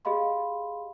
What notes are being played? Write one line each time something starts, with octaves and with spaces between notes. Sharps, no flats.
G4 G#4 D#5 F5 B5 C6